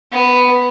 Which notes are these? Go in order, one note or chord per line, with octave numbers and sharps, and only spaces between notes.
B3